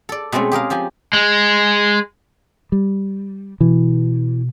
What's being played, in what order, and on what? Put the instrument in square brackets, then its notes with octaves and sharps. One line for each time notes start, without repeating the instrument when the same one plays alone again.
[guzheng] A4 D5
B2 G#3 A3 C4 C#4
G4 G#4 A#4 F5
F3 G4 G#5
[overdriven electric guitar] G#3
[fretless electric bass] G3
[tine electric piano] B2 [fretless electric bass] E3